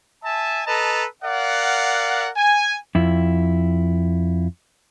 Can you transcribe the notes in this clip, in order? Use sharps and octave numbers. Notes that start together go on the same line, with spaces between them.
E5 G#5 A5
A4 B4 D#5 A5 A#5
A#4 D5 F5 F#5
G#5
F2 E4